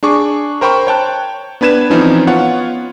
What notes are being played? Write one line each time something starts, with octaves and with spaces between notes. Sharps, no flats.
D4 G#4 C#6 D6
A#4 C5 G5 B5 C#6
C#5 G5 A5 F#6
B3 D4 B4 G#6 E7
E3 F3 C4 C#4 D#4
B3 F4 C#5 F#5